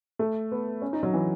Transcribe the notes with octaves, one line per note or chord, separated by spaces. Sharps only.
A3
B3
C#4
D#4
F#3
E3